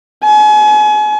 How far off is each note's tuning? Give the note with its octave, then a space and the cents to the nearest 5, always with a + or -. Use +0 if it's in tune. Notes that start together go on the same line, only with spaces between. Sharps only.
G#5 +35